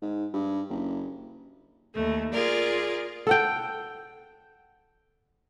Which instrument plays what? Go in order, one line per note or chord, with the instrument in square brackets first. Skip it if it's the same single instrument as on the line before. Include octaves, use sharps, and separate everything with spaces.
[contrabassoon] G#2
G2
F#1
[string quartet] D#2 A3
F4 G#4 A#4 D5
[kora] A4 F#5 G5